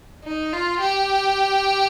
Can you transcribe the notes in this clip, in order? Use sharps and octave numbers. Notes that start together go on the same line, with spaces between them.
D#4
F4
G4